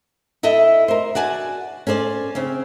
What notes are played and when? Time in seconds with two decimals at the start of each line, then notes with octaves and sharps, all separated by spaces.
0.43 E4 A4 D#5 E5
0.88 A#4 C5
1.15 F#4 D5 G#5 A5
1.87 C#4 A4 C5 D5
2.35 C#3 C4 C#4